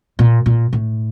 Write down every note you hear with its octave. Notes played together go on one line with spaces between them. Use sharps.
A#2
A#2
A2